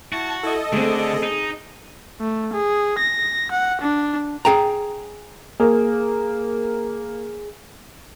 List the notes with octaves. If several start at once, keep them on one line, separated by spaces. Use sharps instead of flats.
E4 F#4 A5
E4 A4 D#5
D3 A3 C4 G#4
D#4
A3
G#4
A#6
F#5
D4
G#4 G5 A#5
A#3 G#4